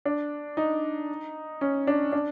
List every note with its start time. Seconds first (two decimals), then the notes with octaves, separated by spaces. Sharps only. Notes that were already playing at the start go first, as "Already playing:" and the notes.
0.05 D4
0.57 D#4
1.61 C#4
1.87 D4
2.12 D4